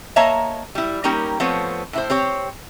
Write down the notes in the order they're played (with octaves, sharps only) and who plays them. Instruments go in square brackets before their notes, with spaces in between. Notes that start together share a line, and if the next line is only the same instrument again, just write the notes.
[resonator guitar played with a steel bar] A#3 C#5 D#5 E5 A5 A#5
G3 E4
G3 A#3 C#4 D#4 G4 A#4
F3 A3 B3 C4 C#5
A2 E4 C5
C4 G4 C#5